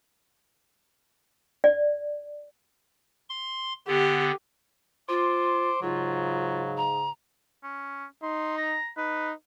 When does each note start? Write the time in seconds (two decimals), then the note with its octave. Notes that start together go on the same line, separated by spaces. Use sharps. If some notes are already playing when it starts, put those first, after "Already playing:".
1.64 D5
3.29 C6
3.87 D3 B3 G4
5.09 F4 C5 D6
5.82 G#2 C#3 F#3 F4
6.77 A#5
7.63 C#4
8.23 D#4 C6
8.58 A#5
8.98 D#4 B4